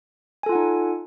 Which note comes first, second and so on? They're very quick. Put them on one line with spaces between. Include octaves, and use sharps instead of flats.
G#5 A4 F4 F#5 D#4